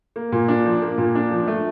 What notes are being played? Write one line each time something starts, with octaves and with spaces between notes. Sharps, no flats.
A#3
A#2
D4
F3
A#3
A#2
D4
F3
A3